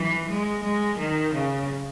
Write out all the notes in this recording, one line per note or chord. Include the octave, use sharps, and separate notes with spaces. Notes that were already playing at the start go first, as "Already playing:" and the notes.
Already playing: E3
G#3
G#3
D#3
C#3